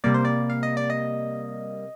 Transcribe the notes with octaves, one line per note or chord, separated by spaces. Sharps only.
C3 G3 A#3 D5
C5
D5
F5
D#5
D5
D#5